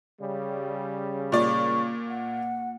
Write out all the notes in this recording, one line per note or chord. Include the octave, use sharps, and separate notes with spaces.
C#3 G3
A#2 A#3 F4 D5 C#6
F#5